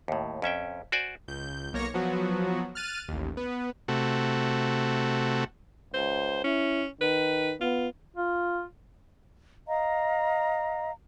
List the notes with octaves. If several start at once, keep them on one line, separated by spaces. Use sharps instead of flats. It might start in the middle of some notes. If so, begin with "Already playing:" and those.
D#2 A2
F2 C#4 E5 G5
F#4 C5 D5 G#5
C#2 G6
B1 A#3 C#5 A#6 C#7
F3 F#3 B3 F#4
F6 F#6 A6 D#7
A1 D#2
B3 B4
C3 A3 F#4
C#2 C5
C#4 E4
D#3 B4
B3 F4
F4
D#5 F5 A#5